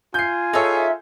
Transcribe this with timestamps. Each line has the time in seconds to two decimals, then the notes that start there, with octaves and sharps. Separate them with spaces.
0.14 F4 G#5 G6 C7
0.53 D#4 G#4 A4 C#5 E5